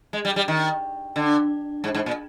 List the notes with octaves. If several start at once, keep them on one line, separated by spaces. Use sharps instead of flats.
G#3
G3
G3
D#3
D3
G#2
G#2
A#2